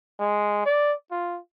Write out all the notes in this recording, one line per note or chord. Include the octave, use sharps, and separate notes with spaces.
G#3
D5
F4